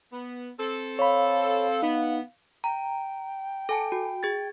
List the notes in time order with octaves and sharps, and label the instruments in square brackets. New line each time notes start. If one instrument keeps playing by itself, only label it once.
[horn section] B3
C4 A4
[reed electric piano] C#5 B5 [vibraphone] F5
[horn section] B3 [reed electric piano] D#4
[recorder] G5 [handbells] A#5
[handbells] A4 G#5 A5
F#4
G#4 G#6 A6